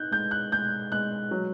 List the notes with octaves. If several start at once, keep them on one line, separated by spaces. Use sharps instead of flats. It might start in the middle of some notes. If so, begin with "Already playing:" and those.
Already playing: D#4 F#6 G6
G#3 G6
F#6
G#3 G6
G#3 F#6
F#3